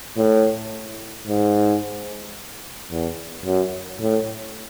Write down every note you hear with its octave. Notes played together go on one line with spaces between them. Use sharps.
A2
G#2
E2
F#2
A2